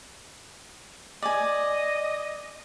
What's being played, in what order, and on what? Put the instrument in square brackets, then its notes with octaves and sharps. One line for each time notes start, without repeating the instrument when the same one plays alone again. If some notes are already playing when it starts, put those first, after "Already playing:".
[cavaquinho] D5 G#5 [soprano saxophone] D#5